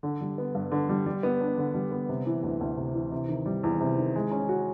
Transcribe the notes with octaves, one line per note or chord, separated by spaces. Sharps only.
D3
G3
B3
G2
D3
G3
G3
B3
D4
D3
G3
B3
C3
E3
D2
D2
C3
E3
C3
D#3
G3
E2
C3
D#3
G#3
C#4
F#4